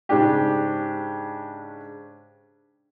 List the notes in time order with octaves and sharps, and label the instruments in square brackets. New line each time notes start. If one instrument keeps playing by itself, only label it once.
[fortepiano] G#2 C#3 D4 G4